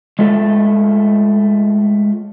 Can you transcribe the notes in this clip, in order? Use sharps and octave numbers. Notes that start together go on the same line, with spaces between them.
G#3 A3 F4 A4